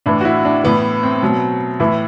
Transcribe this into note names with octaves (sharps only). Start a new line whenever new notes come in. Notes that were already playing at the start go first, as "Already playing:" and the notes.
A2 E3 D4
F#4
E4
D4
A2 E3 B3
C4
B2 F#3
A2 E3 E4